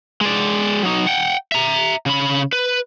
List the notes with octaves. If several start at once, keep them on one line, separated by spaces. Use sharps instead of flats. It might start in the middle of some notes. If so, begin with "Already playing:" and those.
G#3 D5
F#3 D#4
F#5 G5
E5 A#5
C#3 B5
B4